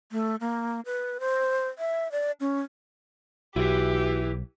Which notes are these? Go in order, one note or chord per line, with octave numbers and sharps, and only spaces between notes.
A3
A#3
B4
C5
E5
D5
C#4
B1 E4 F#4 G4 B4